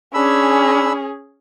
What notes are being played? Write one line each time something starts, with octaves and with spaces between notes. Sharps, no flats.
C#4 D4 G#4 B5 E6